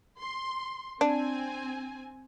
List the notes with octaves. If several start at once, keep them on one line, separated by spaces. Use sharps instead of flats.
C6
C4 D4 G#5